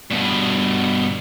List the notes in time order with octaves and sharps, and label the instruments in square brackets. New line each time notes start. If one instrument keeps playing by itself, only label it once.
[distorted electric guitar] G2 B2